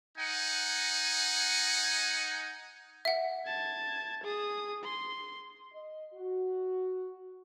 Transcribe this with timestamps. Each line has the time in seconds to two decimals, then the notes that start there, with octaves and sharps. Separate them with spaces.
0.18 D#4 F#5 G#5
3.05 E5 F#5
3.47 A5 G#6
4.24 G#4 D#6
4.84 C6
5.72 D#5
6.14 F#4